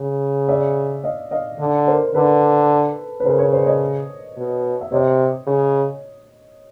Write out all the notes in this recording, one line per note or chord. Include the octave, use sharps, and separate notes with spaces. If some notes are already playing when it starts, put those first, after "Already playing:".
Already playing: C#3
D5 E5
D#5 F5
D#5 F5
D3
A#4 C5
D3 A4 B4
B4
C#3 A#4 C5
B4 C#5
C5 D5
C#5 D#5
B2
E5
C3 C#5 D#5
C#3